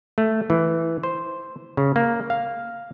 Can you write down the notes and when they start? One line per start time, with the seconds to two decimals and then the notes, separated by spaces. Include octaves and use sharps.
0.18 A3
0.50 E3
1.03 C5
1.77 C#3
1.96 A#3
2.30 F5